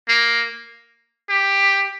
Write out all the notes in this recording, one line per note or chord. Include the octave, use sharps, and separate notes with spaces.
A#3
G4